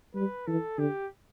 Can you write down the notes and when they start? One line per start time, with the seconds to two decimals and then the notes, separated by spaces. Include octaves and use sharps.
0.15 G3 B4
0.47 E3 A4
0.78 D3 G4